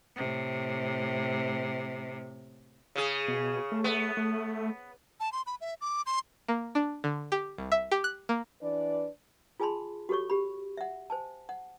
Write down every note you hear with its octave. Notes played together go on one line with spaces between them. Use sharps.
A2 C3
C#3 G#4
B2
A3
B3
A3
A5
C6
B5
E5
D6
C6
A#3
D4
D3
G4
C2
E5
G4
F#6
A#3
E3 D4 B4 D5
F4 G#4 G#5 A5 B5 C6
F#4 G4 A4 C#5 C#6
G4 B5
E5 F#5
C5 G#5 A5
F#5